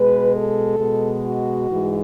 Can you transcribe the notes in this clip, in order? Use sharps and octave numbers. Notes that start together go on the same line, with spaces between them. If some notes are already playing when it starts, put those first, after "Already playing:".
Already playing: B2 G#3 B4
A4
B2 G#3
F#4
G#2 E3 G#3